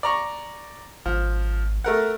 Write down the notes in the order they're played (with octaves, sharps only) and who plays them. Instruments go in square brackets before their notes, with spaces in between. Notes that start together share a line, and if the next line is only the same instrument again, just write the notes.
[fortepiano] D5 A#5 C#6
[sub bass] G#1 [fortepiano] F3
[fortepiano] A3 A#4 F#5